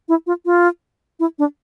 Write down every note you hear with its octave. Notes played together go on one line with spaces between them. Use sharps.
E4
F4
F4
E4
D4